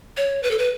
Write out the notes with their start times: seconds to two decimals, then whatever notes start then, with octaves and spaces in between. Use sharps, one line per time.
0.17 C#5
0.43 B4
0.51 A4
0.59 B4